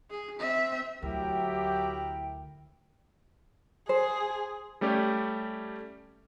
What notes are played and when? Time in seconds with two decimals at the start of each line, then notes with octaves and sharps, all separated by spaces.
0.10 G#4
0.39 C4 E5
1.02 D2 F#3 E4 G4 A#4 E5 G5
3.89 G#4 C5
4.81 G3 A3 C#4 G4 D5